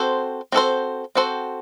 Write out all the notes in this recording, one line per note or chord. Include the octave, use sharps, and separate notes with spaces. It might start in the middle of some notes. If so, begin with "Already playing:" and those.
Already playing: C4 F#4 A4 C5
C4 F#4 A4 C5
C4 F#4 A4 C5